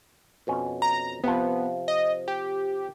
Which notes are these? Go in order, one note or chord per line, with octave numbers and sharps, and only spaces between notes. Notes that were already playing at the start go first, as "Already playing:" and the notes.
F2 B2 C#4
A#5
C3 F3 B3
D#5
G4